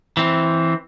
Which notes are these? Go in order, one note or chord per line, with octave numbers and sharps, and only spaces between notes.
E3 C4